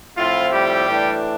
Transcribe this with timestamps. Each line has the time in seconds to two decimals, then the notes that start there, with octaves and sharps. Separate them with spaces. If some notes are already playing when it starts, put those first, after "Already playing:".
0.17 A2 F3 C4 E4 F4
0.52 G3 G4
0.87 A2 E3 A3 D4